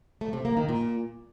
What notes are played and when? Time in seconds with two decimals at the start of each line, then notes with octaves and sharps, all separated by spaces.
0.21 A3
0.33 C3
0.45 A#3
0.57 D#3
0.69 A#2